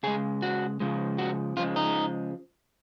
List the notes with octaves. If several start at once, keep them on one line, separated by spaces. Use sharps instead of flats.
C#3 G#3 G#4
F#4
C#3 F3 G#3
F#4
C#3 F3 G#3 F4
D#4